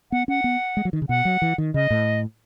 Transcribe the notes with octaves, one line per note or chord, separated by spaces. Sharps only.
B3 F#5
C#4 F#5
B3
G#3
F#3
D#3
C#3
B2 F#5
F#3
E3
D#3
C#3 D#5
A2